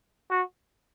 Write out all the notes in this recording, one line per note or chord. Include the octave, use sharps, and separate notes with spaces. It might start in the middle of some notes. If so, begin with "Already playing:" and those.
F#4